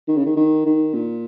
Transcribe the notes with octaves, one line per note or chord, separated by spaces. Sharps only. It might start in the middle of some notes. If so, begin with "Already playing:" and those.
D#3
C#3
D#3
D#3
D#3
A#2